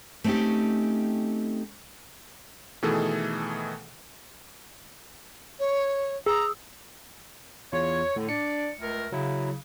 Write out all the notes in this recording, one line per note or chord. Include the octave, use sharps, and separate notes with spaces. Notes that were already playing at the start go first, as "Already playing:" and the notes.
A3 C4 C#4 D#4 G4
B2 D#3 E3 A3 G#4 A4
C#5
G#4 A#5 D#6 E6
E2 F4 C#5
A2 D3
D4 D5 C#7
C#2 A3 A#4
C#3 F#3 E4